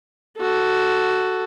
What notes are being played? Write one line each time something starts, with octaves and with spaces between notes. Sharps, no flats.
F#4 A4